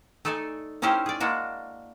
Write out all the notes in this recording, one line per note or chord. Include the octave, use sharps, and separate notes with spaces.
A3 D#4 A4 D5 G#5
C#4 D#4 E4 G4 A#4 C5
G#4 D5
G#3 A#3 D4 F#4